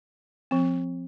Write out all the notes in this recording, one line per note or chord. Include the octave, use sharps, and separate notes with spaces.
F3 C4